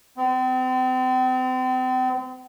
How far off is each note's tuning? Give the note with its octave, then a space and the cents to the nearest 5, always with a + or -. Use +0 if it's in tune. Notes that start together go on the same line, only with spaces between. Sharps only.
C4 -40